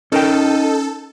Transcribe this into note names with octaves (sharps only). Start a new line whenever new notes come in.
C#4 D#4 A4 A#4 G5